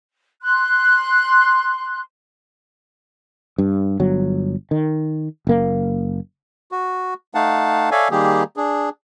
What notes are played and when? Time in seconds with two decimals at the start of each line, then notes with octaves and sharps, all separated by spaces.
0.43 C6 F#6
3.58 G2
4.00 G1 F#3
4.71 D#3
5.47 F#1 A#3
6.72 F#4
7.35 A3 D#4 F5 F#5 A5
7.91 A4 C#5 D5 E5 F5 G#5
8.11 D#3 G3 A#3 G4 G#4
8.57 D4 G#4